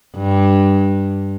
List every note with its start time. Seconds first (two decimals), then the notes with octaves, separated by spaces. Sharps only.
0.16 G2